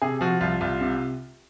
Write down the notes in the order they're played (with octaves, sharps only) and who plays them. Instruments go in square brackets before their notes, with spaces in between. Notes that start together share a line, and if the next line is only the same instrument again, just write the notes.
[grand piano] C3 G#4
F3 F#4
C2 F4
C2 F4
C3